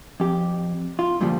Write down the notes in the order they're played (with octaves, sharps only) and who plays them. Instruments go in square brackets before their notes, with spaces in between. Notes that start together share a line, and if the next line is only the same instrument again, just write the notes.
[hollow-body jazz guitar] F2 G4
F4
G2 A#2 D3 F3 G3